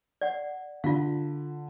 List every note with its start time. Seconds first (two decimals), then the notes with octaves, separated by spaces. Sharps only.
0.21 D5 F#5
0.84 D3 F4 F5